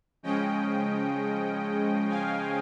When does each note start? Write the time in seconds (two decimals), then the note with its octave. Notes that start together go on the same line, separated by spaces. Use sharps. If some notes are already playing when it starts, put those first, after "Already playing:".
0.23 C#3 F3 G#3 C#4 D#5 G5
2.09 F5 G#5